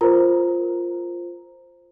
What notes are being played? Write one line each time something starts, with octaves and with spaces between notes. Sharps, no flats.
F4 A#4 C5 A#5